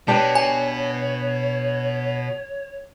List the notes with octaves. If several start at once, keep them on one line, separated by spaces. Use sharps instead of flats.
B2 D4 G4 B4 C#5
G#5